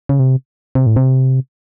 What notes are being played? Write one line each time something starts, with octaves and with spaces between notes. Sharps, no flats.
C#3
C3
C3
A2
C3